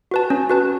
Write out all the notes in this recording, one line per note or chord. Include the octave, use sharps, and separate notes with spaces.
F#4 B4 A5
C#4
F#4 B4 A5